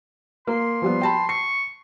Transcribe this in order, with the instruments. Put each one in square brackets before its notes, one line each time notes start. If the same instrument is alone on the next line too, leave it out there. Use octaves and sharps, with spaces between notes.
[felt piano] A#3 [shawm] C6
[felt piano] F3 G3 B3
G5 A5 B5
[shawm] C#6 [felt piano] C7